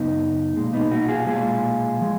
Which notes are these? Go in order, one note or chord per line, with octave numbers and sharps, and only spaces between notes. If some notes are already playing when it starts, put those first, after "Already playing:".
Already playing: F#2 C#3 F#3 B3 D#4
B1 A#2 G#3
B3 D#4
D#4 F#4
F4 G#4
B1 A#2 G#3 F4 G#4
F3 G#3